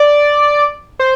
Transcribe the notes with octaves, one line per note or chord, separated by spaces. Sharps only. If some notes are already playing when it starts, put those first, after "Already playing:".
Already playing: D5
C5